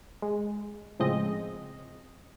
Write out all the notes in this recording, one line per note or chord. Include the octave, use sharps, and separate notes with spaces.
G#3
A2 C#3 F3 G#3 C4 D#5